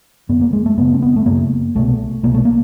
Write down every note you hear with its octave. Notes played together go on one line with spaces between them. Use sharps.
F#2 D3 B3
A#3
G#3
A3
F#2 C#3 B3
C4
B3
A3
F#2 C#3 A#3
C2 B2 A3
C2 B2 A#3
A3
A#3